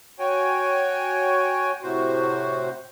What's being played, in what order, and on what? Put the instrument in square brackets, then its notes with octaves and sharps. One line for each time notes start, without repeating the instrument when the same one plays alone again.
[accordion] F#4 C#5 G5 G#5
A2 C3 F#4 C5